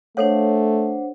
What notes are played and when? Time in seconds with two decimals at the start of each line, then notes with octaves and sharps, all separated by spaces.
0.17 A3 D4 A4 C5 C#5 F5 F#5